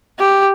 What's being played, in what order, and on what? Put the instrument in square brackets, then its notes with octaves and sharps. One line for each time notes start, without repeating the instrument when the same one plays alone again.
[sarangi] G4